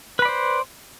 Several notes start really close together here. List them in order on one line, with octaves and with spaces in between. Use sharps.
B4 B5 D5 C5